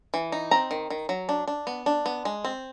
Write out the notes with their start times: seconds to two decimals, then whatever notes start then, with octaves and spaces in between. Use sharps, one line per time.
0.14 E3
0.32 D#4
0.51 C4 A#5
0.71 D#3
0.90 D#3
1.09 F#3
1.29 D4
1.48 D4
1.67 B3
1.86 D4
2.06 B3
2.25 G#3
2.45 C4